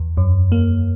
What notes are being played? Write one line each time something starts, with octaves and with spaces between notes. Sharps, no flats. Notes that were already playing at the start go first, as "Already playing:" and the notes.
Already playing: E2
F#2
A#3